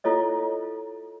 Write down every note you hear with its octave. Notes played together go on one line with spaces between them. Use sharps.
E4 F4 A4 C#5 D#5